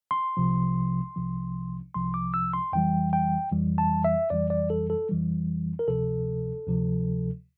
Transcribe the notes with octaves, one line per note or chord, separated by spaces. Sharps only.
C6
C2 C3 F3
C2 C3 F3
C2 C3 F3 C6
D6
E6
C6
F2 E3 G3 G5
G5
F2 E3 G3
A5
E5
F2 E3 G3 D5
D5
A4
A4
F2 E3 G3
A#4
D2 C3 F3 A4
D2 C3 F3